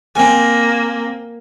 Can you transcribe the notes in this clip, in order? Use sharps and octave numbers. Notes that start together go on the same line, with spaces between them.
A#3 C4 G#5